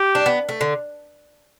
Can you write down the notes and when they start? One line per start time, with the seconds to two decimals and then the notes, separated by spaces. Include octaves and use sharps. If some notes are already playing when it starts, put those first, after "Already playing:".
Already playing: G4
0.15 D4
0.26 B3
0.49 A3
0.61 D3